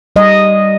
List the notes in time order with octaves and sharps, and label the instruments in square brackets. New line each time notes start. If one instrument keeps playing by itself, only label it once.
[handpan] G3 D#5